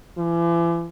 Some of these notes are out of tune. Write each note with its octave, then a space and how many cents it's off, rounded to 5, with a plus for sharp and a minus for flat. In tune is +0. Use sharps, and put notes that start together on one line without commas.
E3 +40